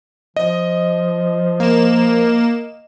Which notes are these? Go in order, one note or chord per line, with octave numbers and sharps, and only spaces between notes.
F3 D#5
A#3 E7